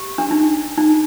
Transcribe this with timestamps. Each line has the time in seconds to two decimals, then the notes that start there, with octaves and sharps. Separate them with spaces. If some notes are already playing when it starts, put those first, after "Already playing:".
Already playing: G4
0.18 D4
0.31 D#4
0.78 D#4